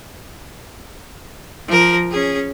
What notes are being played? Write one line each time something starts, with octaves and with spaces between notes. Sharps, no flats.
F3 A#4
C#4 G#4